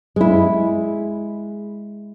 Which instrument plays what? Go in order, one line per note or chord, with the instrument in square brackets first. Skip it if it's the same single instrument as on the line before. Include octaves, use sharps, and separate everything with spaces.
[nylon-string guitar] G#3 E4